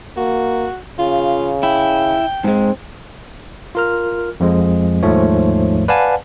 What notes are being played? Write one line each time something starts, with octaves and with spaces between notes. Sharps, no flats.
A#3 F#4
C#3 F4
E4 G5
G#2 G#3 C4
F4 A#4 F6
F2 F3 G#3
D#2 G#2 F3 A3 C#5
B4 D5 F5 F#5 G#5 A5